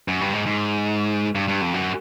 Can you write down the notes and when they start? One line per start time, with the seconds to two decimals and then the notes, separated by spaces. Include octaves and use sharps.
0.08 F#2
0.21 G2
0.33 G#2
0.46 G#2
1.35 G2
1.48 G2
1.61 F2
1.74 F#2